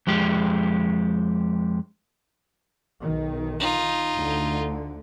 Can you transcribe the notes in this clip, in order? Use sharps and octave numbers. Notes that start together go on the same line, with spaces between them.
F2 G#3 G4
B1 D#3
D#4 F4
D2 D3 A3